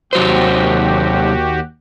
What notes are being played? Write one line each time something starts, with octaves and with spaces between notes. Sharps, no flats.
D#2 C3 F#3 F#4 G4 C5